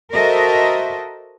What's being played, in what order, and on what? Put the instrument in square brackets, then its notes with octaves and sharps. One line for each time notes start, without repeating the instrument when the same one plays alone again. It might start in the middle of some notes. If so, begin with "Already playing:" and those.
[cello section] F#4 A4 A#4 C5 D#5 E5